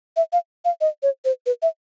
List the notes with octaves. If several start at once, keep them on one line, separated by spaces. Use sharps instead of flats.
E5
F5
F5
D#5
C#5
C5
B4
E5